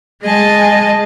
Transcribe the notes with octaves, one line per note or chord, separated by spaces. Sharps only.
G#3 G#4 D#5 G#5 A5